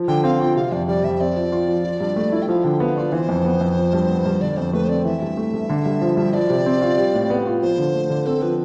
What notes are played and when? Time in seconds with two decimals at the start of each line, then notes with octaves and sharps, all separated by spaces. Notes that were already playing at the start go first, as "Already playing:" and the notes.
Already playing: F3
0.08 D3 G5
0.24 C4 F5
0.40 F4 G5
0.56 C3 F5
0.72 F2 D5
0.87 G3 D5
1.04 F2 E5
1.20 C4 D5
1.36 F3
1.52 F4
1.68 F3
1.85 F3
2.01 G2
2.16 A3
2.32 E4
2.42 G5
2.48 F3 F5
2.64 D3 G5
2.80 B3 F5
2.96 F4 D5
3.12 E3 C5
3.29 F2
3.45 B3
3.61 F2
3.77 F3
3.93 G2
4.09 B3
4.25 G2
4.41 D3 D5
4.57 F2 C5
4.73 A3 B4
4.85 C5
4.89 C4 D5
5.05 E3 E5
5.22 G2
5.37 A3
5.54 G2
5.70 D3
5.86 G2
6.02 F3
6.17 G2
6.34 F3 D5
6.49 C3
6.66 C4
6.82 F4
6.98 G3
7.14 A2
7.30 B3
7.46 F4
7.62 F3 C5
7.78 D3
7.94 A3
8.10 D3
8.26 C4 A4
8.42 F3 B4